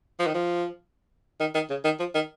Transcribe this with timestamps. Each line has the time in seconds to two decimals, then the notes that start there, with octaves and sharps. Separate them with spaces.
0.20 F3
0.27 D#3
0.34 F3
1.40 D#3
1.55 D#3
1.70 C#3
1.84 D#3
2.00 F3
2.15 D#3